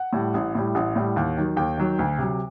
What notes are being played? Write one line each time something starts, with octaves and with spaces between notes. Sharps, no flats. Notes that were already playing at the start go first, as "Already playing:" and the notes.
Already playing: F#5
A2 G3
A1
A2 G3
A1 F#5
A2 G3
D#2
D#3 F#3
D#2 G5
D#3 F#3
D2
C3 F#3